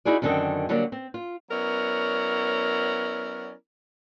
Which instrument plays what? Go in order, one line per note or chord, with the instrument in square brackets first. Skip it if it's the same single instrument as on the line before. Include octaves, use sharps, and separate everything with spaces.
[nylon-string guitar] D#4 E4 F#4 G#4 D5
F#2 D3 D#3 C4 A4 D#5
D3 F#3 G3 A#3 D4
C4
F4
[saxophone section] F#3 B3 C#4 E4 A#4 D5